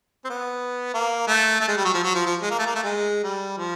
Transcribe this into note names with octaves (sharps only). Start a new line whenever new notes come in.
C4
B3
A#3
A3
A3
G#3
G3
F#3
F3
F#3
F3
F3
G#3
A#3
A3
A#3
A3
G#3
G3
F3